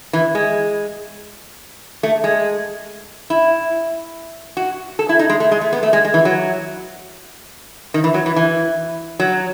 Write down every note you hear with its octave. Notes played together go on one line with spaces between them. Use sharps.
E3
G#3
A3
G#3
E4
F#4
A4
E4
D#4
G#3
A3
G#3
A3
B3
A3
G#3
G#3
E3
F#3
D#3
E3
F#3
E3
E3
F#3